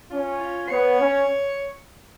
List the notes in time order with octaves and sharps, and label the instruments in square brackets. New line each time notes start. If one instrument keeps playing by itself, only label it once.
[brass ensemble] C#4 [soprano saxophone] F4
[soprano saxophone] F4
[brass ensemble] B3 [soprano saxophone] C#5
[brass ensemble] C#4